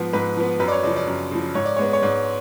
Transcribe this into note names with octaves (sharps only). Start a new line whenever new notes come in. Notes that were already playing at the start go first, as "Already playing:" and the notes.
Already playing: G#2 F3 B3
G#2 B4
F3 B3
F#2 B4
D5
C#5
C#3 F3 D5
D5
F#2
C#3 F3
G#2 C#5
D5
G#3 B3 C#5
C#5
G#2 D5